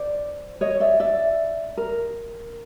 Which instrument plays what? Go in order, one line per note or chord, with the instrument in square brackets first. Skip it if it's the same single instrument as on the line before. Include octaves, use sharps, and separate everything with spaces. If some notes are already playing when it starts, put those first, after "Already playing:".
Already playing: [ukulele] C5 D5
C#5 D#5
D5 E5
D5 E5
A#4